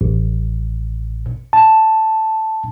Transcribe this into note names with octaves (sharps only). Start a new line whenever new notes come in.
A1
A5